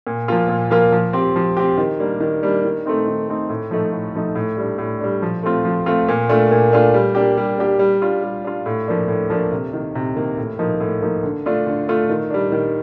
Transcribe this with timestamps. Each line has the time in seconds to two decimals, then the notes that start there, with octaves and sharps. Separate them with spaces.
0.07 A#2
0.28 F3 A#3 F4
0.49 A#2
0.71 F3 A#3 F4
0.92 F3
1.13 C4 G4
1.36 F3
1.57 C4 G4
1.78 D#3
2.00 G3 A#3 D4
2.20 D#3
2.43 G3 A#3 D4
2.64 D#3
2.86 A3 C4 D#4
3.07 D#3
3.28 A3 C4 D#4
3.49 A2
3.71 F3 A3 D#4
3.92 A2
4.15 F3 A3 D#4
4.35 A2
4.57 G3 D4
4.78 A2
5.00 G3 D4
5.22 F3
5.43 A3 C4 F4
5.65 F3
5.86 A3 C4 F4
6.08 A#2
6.29 A3 D4 F4
6.51 A#2
6.72 A3 D4 F4
6.94 G3
7.15 A#3 D4 G4
7.37 G3
7.58 A#3 D4 G4
7.79 G3
8.02 D4 F4
8.23 G3
8.44 D4 F4
8.66 A2
8.88 F3 A#3 D4
9.08 A2
9.30 F3 A#3 D4
9.52 C3
9.73 D#3 A#3
9.95 C3
10.16 D#3 A#3
10.38 A2
10.59 F3 A#3 D#4
10.80 A2
11.02 F3 A#3 D#4
11.23 D3
11.46 A3 D4 F4
11.67 D3
11.88 A3 D4 F4
12.09 D#3
12.30 G3 D4
12.52 D#3